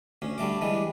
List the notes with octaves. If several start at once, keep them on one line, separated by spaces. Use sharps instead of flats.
D2 C#4
D3 G3 A3 D6
E3 G3 G#3